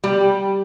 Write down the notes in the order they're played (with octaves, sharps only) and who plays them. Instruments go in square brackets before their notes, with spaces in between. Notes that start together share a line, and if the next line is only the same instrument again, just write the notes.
[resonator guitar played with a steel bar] G3